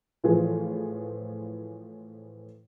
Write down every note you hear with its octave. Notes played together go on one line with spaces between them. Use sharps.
A2 E3 F3 F4 G#4